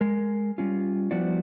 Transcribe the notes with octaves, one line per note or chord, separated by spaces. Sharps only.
G#3 A#4
G3 C#4 F4
F3 G3 B3 E4 F#4 D5